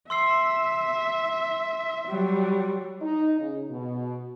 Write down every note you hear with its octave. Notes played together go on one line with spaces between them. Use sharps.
E5 C6 E6 C7
F#3 G3
D#4
C#3
B2